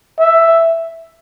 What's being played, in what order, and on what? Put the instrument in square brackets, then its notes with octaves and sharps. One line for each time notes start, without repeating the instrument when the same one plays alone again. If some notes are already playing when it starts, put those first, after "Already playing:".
[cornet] E5